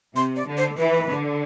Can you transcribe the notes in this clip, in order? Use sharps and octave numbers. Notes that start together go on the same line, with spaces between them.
C3 C6
D5
D3
C5
E3 B4
D3